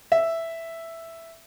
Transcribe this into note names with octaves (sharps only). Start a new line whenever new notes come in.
E5